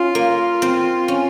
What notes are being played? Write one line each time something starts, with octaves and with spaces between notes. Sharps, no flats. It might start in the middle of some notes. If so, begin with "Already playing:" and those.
Already playing: C#4 F4
A#3
C4
C#4